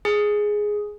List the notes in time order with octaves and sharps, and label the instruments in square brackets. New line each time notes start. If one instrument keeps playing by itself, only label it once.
[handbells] G#4